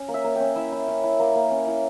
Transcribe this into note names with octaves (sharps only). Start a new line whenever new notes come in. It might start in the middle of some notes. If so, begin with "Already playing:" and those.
Already playing: C#4
A#3
E5
A#3
C#4 G5
E4 E5
E4
C#4
E4
A#3
A#3
C#4
E4